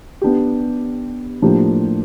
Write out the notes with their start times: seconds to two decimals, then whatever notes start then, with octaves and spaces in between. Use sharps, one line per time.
0.22 B3 D4 G4
1.42 A2 F3 A#3 D4 G4